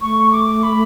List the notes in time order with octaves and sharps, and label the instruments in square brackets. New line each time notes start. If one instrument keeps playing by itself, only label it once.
[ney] A3 [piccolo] C#6
[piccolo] D6
B5